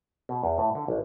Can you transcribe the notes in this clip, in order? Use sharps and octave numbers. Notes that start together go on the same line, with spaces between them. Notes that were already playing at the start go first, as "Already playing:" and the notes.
B2
E2
A2
D3
A1